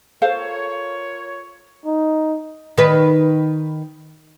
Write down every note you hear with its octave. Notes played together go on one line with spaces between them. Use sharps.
F4 A4 A#4 C5 C#5 F5
D#4
D#3 B4